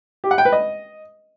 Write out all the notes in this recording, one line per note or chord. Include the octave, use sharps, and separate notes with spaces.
G4
F#5
G5
B4
D#5